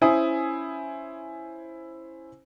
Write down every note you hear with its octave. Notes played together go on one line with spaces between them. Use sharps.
C#4 E4 C5 G#5 D#6